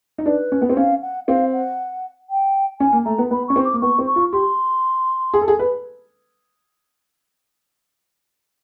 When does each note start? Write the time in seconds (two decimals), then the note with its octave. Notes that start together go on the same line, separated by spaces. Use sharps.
0.18 D#4
0.26 D4 B4
0.52 C#4
0.62 B3
0.70 C4
0.77 C#4 F5
1.02 F#5
1.28 C4 F5
1.53 F#5
2.30 G5
2.80 C#4 G#5
2.93 A#3
3.05 A3 A#5
3.18 B3
3.31 B3 B5
3.48 C#4 C#6
3.56 C4
3.65 D6
3.73 A#3
3.81 B3 C#6
3.99 C4
4.07 C#6
4.16 F4
4.33 G4 C6
5.34 G#4
5.41 A4
5.48 G#4
5.59 B4